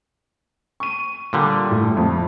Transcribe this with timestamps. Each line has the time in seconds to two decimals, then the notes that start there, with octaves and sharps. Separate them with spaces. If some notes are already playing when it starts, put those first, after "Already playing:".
0.80 C#6 D#7
1.33 A#2 D3 G3
1.71 A2
1.97 F2